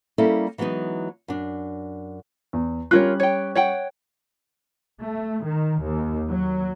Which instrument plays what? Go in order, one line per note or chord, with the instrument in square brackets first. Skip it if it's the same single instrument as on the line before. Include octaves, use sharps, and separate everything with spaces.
[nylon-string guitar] G3 A#3 C#4 E4 A4
E3 F#3 G#3 B3 D#4
F#2 D4
[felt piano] E2
[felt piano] G3 C#4 F#6 [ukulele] F4 A#4 C#5
[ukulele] C#5 G5
C#5 F#5 G5
[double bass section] A3
D#3
D#2
F#3